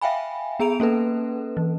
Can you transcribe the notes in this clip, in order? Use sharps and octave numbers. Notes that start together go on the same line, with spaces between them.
E5 F5 G5 G#5 B5
B3 G#4 A#5 D7 F7
A#3 C#4 A4 B4
E3